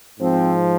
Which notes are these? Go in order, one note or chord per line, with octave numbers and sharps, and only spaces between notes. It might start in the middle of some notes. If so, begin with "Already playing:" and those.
G#2 F3 C4